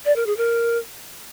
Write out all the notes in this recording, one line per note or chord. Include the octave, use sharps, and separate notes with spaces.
D5
A#4
G#4
A#4